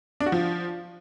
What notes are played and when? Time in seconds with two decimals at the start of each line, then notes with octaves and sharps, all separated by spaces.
0.20 D4
0.26 F#4
0.32 F3